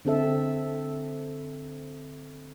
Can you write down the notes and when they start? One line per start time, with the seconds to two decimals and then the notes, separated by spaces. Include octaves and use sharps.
0.05 D3 C4 A4 E5